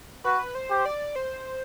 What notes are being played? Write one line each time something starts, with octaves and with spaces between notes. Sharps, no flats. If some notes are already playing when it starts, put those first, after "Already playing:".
F#4 B4
C5
G4
D5
C5